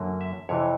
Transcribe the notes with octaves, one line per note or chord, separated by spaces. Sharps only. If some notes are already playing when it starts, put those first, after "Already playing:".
Already playing: F#2 D3 F#3 A#3
E5
F2 C3 E3 C#5